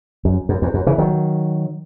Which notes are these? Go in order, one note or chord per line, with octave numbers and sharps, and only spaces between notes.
F#2
F#2
E2
F#2
C#3 E3
D#3 F#3